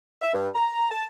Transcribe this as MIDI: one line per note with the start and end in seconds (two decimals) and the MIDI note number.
0.21 0.32 76
0.33 0.48 43
0.55 0.88 82
0.90 1.05 81